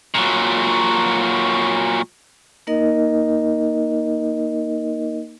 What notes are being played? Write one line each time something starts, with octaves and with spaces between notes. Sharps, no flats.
A#2 F#3
A#3 D#4 A#4 D#5